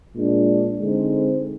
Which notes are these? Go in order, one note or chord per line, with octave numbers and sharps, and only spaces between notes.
A#2 G#3 D4
D3 G#3 C4 D#4